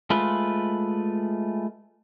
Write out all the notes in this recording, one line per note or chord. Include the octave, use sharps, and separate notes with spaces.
G#3 A3 F4 B4